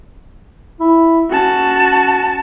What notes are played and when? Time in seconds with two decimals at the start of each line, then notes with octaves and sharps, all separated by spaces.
0.80 E4
1.30 C#4 F#4 A5